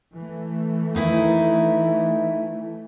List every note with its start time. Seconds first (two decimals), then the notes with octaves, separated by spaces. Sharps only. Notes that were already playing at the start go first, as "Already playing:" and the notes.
0.15 E3 A3
0.95 D#3 D#4 E4